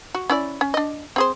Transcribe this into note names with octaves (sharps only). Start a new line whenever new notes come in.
F#4
C#4 E4 D5
C#4
D4 D#5
C4 G#4 C5